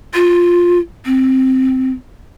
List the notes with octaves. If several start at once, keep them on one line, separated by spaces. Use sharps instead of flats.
F4
C4